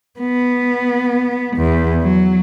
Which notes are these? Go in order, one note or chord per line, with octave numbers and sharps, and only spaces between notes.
B3
E2
F#3